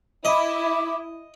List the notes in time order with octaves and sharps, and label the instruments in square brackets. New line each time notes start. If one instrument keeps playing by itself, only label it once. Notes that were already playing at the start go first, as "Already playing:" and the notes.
[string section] E4 [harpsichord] D#5 [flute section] B5 D6